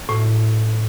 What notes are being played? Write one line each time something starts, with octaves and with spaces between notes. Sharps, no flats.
A2